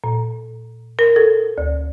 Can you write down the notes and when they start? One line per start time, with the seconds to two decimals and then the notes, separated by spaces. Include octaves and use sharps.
0.04 A#2
0.99 A#4
1.16 A4
1.58 D2